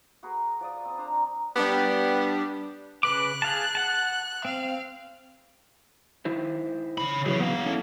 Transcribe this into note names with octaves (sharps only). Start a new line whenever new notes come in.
F#4 G#4 A#4 B4
F3 D5 D#6
C4 D#6
D4 C5 A#5
G3 B3 D4 G4
C#3 B4 D6 F#6
G#4 F5 A5
F#5 A5
C4 F5
D#3 E4 C5
C#3 B5
E2 E3 F#3 G#4 C#5
B3 F5
C#4 E4 A4